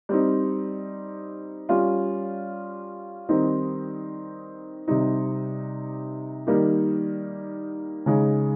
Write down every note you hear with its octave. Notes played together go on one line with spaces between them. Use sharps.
G3 C4 D#4
G3 C#4 F4
D#3 G3 C4 D#4
C3 G3 C4 D#4
D#3 G3 A#3 D#4
C#3 G#3 D#4